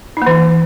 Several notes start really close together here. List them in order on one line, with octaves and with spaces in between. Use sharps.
D#4 A#3 E3